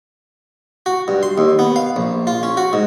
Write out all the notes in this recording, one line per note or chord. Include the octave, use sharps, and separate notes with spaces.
F#4
G2
C6
D#2
B3
F5
A#1
F4
C#4
F#4
G#2